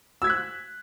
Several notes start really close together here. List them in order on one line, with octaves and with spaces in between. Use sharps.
E6 G#6 B6 F#6